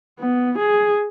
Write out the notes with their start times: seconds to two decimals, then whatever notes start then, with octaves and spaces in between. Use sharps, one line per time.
0.19 B3
0.58 G#4